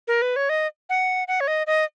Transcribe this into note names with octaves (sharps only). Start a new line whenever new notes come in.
A#4
B4
C#5
D#5
F#5
F#5
C#5
D#5
D#5